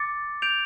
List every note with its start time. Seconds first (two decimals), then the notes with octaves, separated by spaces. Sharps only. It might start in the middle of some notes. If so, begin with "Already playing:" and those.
Already playing: D6 A6 C#7
0.42 G6 D7 F7